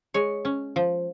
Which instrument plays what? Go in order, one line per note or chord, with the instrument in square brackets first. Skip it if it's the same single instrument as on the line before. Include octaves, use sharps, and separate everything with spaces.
[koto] G#3 C#5
C#4
F3